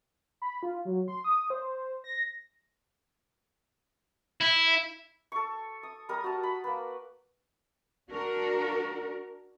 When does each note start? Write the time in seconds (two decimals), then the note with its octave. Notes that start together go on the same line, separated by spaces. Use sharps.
0.42 B5
0.63 F4
0.85 F#3
1.08 C6
1.24 D#6
1.50 C5
2.04 A#6
4.41 E4
5.32 A4 C#6
5.83 D#6
6.09 G3 A#4 D#6
6.24 F#4 A5
6.43 B5
6.64 A#3 B4
8.10 D4 F#4 A#4